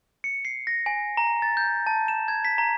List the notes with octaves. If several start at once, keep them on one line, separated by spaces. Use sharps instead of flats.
C#7
C7
A#6
G#5
A#5
A6
G6
A5
E7
G#6
B6
A#5